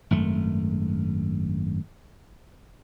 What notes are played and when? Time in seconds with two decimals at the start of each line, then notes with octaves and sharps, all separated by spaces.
0.11 G#1 F#2 A3